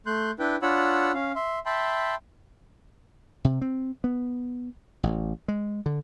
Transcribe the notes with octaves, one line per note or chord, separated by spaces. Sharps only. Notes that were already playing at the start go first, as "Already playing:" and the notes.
A3 C6 F#6 G6
D4 E4 B4 G5
D4 F4 C#5 F#5 B5 E6
C#4 F5
E5 C6
E5 G5 A5 B5 C6
C3
C4
B3
A1
G#3
D3